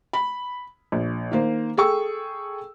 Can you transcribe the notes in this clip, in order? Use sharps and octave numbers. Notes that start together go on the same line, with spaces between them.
B5
A#1
D#3 A#3 C5
G#4 A4 G5 C#6 E6